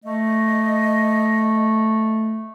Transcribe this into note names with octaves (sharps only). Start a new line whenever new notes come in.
A3 D#5